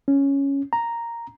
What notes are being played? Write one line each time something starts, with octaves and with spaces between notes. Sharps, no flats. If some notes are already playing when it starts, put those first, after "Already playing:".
C#4
A#5